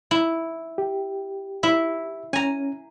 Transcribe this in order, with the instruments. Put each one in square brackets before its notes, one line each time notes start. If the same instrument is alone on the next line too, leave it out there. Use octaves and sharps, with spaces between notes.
[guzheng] E4
[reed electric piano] G4
[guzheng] E4 E5
[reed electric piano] C#4 [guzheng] G#5 A#5